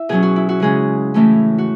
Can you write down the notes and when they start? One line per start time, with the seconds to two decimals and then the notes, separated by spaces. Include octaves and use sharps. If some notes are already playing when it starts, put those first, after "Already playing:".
Already playing: E4 E5
0.09 B2 F#3 C#4 G#4
0.23 F#4
0.36 E4
0.49 F#4
0.60 C#3 G#3 C#4 G#4
1.14 A2 E3 A3 C#4
1.58 F#4